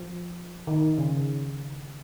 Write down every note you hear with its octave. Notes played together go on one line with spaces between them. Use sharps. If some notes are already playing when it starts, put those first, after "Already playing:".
Already playing: F3
D#3
C#3